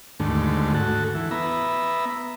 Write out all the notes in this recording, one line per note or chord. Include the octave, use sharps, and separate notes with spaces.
D#2 G#2 D3 A3
F#4 A4
E3
B3 E5 A#5